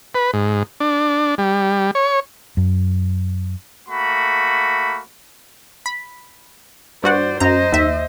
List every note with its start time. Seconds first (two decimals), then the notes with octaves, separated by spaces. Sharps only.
0.15 B4
0.33 G#2
0.80 D4
1.38 G3
1.95 C#5
2.57 F#2
3.88 A3 A#3 F#4 B5
5.86 B5
7.04 G2 F#4 C5 D5 F#5
7.40 F#2 C5 D#5 A#5
7.72 D#2 E5